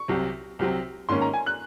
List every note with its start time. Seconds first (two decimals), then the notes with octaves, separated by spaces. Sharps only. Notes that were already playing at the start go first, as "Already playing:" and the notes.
Already playing: C#6
0.08 C2 C3 F#3 C4
0.59 C2 C3 F#3 C4
1.09 G#2 D#3 A#3 C#4 C6
1.21 A#5
1.34 G#5
1.46 F#6